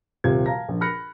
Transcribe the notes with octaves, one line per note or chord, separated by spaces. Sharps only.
D#1 C3 F4 G#6
F5 A5 A#5 A#6
A#1
B5 F6 F#6 A#6 C#7